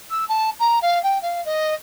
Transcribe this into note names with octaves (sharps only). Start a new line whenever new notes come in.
E6
A5
A#5
F5
G5
F5
D#5